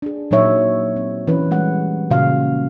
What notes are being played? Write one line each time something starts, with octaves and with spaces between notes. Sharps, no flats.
D4 G#4
A#2 F#3 D#4 C#5 E5
C4
E3 C#4 B4
G3 G#3 F#5
A#2 C#3 F#4 F5